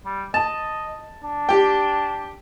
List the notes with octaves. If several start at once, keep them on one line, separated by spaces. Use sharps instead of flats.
G3
D#5 A5
D4
G4 G5